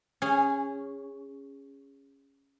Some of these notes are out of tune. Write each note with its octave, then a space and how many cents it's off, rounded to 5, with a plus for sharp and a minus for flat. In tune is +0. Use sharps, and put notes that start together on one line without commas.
C#4 +0 G#4 -20